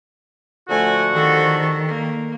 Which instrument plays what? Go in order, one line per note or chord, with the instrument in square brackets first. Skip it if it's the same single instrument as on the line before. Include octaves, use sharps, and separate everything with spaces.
[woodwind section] D3 F3 F#4 [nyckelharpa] A3 G#5
[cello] D#3 [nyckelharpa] G4 A4
[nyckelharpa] A#3